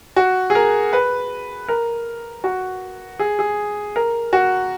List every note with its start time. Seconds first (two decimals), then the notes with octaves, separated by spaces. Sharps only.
0.16 F#4
0.50 G#4
0.55 A#4
0.93 B4
1.68 A#4
2.44 F#4
3.19 G#4
3.39 G#4
3.96 A#4
4.33 F#4